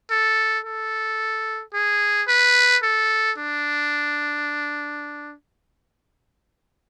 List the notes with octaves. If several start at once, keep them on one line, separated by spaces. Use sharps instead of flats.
A4
A4
G#4
B4
A4
D4